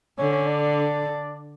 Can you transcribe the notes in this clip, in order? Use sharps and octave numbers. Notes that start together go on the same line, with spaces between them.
D3 C#4
C#4
D4